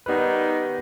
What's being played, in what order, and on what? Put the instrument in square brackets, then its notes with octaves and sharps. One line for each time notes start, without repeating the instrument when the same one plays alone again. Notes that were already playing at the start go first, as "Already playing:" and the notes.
[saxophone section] D#3 G3 D#4 [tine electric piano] B3 B4